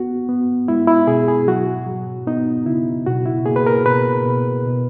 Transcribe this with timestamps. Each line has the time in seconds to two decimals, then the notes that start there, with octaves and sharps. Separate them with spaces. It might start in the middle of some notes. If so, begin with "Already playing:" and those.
Already playing: B3 F#4
0.29 B3
0.68 G#3 E4
0.87 E4
1.07 B2 G#4
1.28 G#4
1.47 F#3 F#4
1.87 F#3
2.27 B3 D#4
2.66 C#3 E4
3.06 B2 F#4
3.26 E4
3.46 A#3 G#4
3.56 B4
3.67 A#4
3.86 B2 B4
4.25 B2
4.66 B2